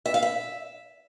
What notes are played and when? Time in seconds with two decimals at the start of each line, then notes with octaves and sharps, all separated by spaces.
0.06 E5
0.14 F5
0.23 E5